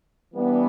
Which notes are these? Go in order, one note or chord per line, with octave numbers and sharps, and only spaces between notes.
E3 G3 B3 D4